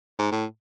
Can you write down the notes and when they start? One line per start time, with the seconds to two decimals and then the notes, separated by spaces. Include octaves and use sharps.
0.19 G#2
0.32 A2